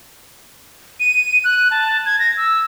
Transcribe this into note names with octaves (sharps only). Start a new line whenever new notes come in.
D#7
F#6
A5
G#6
A#6
E6